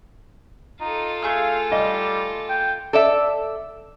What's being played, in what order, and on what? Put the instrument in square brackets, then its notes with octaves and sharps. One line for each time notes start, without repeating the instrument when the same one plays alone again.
[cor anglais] D#4 [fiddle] F4 A4
[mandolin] A3 G#4 E6 [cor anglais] F5
[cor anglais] G3 [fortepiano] D#5
[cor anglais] G5
[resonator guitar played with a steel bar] A4 D5 E5